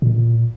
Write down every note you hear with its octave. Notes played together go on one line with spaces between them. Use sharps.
A#2